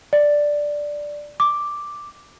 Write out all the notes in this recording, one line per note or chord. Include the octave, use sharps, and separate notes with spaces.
D5
D6